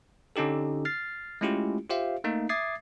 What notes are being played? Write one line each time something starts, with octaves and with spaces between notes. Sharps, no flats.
D3 C#4 D#4 G4 A4
F6 A6 C7
G#3 A3 C#4 E4 F4 G4
F4 G4 C5 E5 F5
A3 A#3 D#4
E5 D6 D#6 G#6 A6 C7